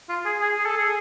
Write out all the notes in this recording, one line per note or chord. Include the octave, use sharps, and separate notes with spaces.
F4
G#4
G#4
G#4
A4
G#4